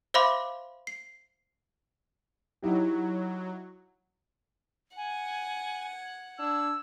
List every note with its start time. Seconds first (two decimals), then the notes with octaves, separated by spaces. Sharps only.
0.14 C5 E5 F5 B5 C6 D6
0.87 C7
2.62 F#3 D#4 E4 G4
4.97 F#5 G#5
5.95 G#6
6.39 D4 E6